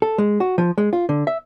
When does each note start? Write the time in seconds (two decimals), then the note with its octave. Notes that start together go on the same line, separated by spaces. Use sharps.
0.02 A4
0.18 G#3
0.40 F#4
0.58 F3
0.78 G#3
0.93 F4
1.09 D3
1.27 E5